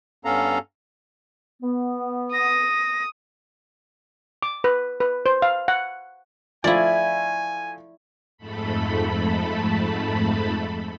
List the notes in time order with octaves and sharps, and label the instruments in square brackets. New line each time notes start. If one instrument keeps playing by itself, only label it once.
[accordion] G2 B3 C#4 A4 F5 A#5
[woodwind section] B3
[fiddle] D#6 [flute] A#6
[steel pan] D6
B4
B4
C5
F5
F#5
[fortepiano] F3 A3 F4 [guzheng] E4 D5 [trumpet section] G#5
[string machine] F2 G#2 A3 A4 B5